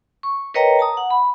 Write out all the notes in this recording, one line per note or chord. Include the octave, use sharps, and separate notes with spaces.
C#6
A#4 B4 C#5 D#5 G5 A#5
A5 A#5 D#6
F#5
B5